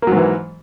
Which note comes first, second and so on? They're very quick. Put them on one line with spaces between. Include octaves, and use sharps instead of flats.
A#3 F#3 G#2 E3